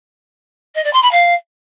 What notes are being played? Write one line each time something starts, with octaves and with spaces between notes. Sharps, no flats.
D#5
D5
C6
B5
F5